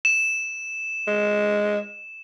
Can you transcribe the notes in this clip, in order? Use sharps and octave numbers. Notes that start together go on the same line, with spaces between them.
E7
G#3